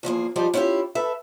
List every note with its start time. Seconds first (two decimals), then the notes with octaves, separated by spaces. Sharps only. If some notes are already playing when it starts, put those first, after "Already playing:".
0.03 E2 F3 A#3 G#4
0.36 F3 G3 D#4 G4 G#4
0.53 B3 C#4 E4 F4 G4
0.95 A4 B4 E5